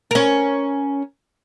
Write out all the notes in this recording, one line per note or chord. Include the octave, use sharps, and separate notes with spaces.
C#4 A#4